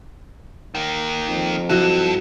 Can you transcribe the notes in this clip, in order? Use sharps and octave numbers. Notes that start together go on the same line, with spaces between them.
D#3 A#3
F2
G2 F#3 E4 F#4